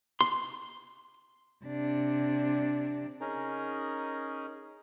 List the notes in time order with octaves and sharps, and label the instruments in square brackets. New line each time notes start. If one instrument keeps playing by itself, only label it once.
[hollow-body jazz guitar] C6
[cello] C3 D4
[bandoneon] C#4 D#4 G#4 A#4